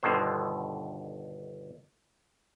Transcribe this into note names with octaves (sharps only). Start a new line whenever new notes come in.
G1 B2 D3 D#3 C5